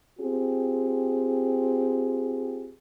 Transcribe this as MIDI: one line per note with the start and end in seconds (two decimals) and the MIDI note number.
0.19 2.73 60
0.19 2.73 65
0.19 2.73 67
0.19 2.73 68